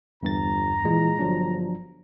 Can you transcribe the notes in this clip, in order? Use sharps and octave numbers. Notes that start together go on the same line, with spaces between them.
G1 E2 G2 A#5 A6
A#2 E3 G#3
G1 F3 F#3 D4